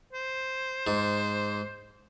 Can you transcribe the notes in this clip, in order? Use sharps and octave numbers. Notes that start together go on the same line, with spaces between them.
C5
G#2